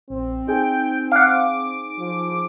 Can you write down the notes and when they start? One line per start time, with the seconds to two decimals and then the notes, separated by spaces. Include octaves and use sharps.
0.10 A#1 C4
0.47 D#4 G#4 G5 G#5
1.12 F5 F#5 D6
1.98 F3